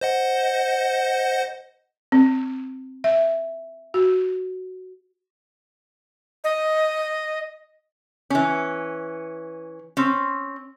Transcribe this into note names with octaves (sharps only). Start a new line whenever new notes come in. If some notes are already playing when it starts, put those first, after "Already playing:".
C5 D#5 F#5
C4
E5
F#4
D#5
E3 C#4
C4 C#4